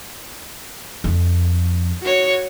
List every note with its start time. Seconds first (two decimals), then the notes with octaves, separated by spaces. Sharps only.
1.04 F2
2.02 F#4 C#5